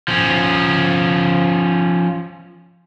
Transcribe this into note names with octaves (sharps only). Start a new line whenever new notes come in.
F3 C#4